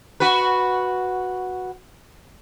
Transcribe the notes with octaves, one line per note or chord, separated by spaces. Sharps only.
F#4 B4